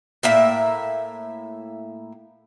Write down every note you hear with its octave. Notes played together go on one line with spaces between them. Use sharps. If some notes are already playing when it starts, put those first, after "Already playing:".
A2 A#3 E5